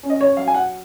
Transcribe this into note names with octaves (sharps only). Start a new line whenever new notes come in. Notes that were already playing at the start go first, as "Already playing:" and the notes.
C#4
D#5
C#5
F#3 F5
G#5
F#5